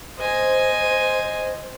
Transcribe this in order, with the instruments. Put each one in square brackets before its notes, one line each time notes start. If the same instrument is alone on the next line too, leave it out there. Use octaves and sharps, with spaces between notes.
[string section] C5 [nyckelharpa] D#5 G#5